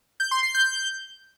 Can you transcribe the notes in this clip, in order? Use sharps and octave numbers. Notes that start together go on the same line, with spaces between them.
G6
C6
C7
G6